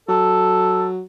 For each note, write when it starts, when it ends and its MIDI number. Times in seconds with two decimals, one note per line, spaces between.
0.09 1.02 54
0.09 0.86 69